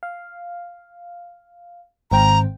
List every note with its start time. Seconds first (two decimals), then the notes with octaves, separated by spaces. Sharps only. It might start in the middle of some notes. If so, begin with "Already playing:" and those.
0.03 F5
2.11 G#1 C4 G5 A#5